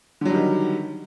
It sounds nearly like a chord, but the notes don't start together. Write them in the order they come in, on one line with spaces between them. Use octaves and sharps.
D3 F#3 G3 D#3